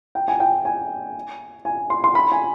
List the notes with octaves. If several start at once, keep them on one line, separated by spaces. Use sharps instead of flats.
G5
G#5
G5
G#5
G#5
C6
C6
B5
G#5